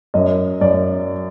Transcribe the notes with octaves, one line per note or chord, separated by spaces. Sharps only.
F#2 D#5
F#2 D5